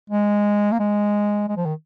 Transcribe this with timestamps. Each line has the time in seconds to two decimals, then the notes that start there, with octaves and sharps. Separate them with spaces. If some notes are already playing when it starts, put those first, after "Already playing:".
0.10 G#3
0.72 A#3
0.79 G#3
1.49 G#3
1.57 F3
1.66 D#3